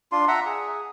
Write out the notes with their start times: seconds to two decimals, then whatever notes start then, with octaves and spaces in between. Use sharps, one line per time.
0.12 D4 F4 C6
0.28 E5 F#5 A#5
0.45 G#4